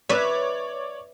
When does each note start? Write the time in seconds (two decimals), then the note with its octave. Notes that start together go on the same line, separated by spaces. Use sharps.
0.09 B4 C#5 D5 E5 D6